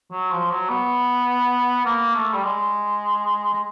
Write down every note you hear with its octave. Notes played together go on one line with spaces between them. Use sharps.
F#3
F3
F#3
B3
A#3
A3
G3
G#3
G#3